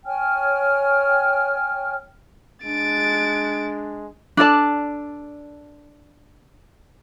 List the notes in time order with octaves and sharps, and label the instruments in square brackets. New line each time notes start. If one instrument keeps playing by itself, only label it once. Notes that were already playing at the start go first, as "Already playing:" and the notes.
[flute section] C#5 G5 G#5 F6
[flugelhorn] G#3 [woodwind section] D4 [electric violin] A6 D7
[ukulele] D4 A4 D5 A5